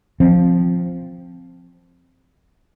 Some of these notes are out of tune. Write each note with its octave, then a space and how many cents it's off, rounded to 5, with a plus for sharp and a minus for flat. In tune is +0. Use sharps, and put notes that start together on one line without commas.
F3 +0 C4 +0